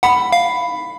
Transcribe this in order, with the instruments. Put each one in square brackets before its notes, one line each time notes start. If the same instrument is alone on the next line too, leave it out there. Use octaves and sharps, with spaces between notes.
[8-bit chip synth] F#5 [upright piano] B5
[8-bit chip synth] F5